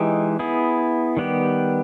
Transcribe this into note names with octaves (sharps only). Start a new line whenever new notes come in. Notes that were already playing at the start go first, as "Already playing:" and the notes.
Already playing: E3 G#3 D#4 G4
B3 E4 G#4
D#3 G3 B3 G4